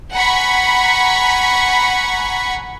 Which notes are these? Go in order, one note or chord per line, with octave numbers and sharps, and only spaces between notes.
F#5 G#5 A#5 B5 C#6 B6